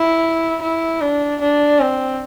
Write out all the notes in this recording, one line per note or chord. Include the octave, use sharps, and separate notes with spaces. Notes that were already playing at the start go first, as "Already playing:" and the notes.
Already playing: E4
E4
D4
D4
C4